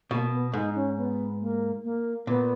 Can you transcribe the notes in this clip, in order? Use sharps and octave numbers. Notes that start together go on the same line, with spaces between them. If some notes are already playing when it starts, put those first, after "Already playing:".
B2 A#3
B3
G#2 D#4
C#4
B3
A#3
A#3
A#2 B3